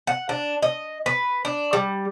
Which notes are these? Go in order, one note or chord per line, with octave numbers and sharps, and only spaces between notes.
F#5
D4
D#5
B4
D4
G3